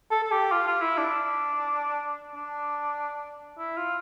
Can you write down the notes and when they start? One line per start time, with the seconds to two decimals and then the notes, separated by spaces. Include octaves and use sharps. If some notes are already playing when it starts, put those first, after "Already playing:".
0.11 A4
0.24 A4
0.32 G4
0.52 F4
0.67 F4
0.82 E4
0.97 D4
2.35 D4
3.58 E4
3.77 F4